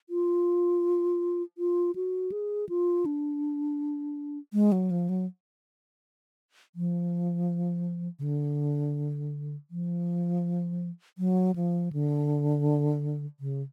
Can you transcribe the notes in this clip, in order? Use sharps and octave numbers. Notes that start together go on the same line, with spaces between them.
F4
F4
F#4
G#4
F4
D4
G#3
F#3
F3
F#3
F3
C#3
D3
F3
F#3
F3
D3
C#3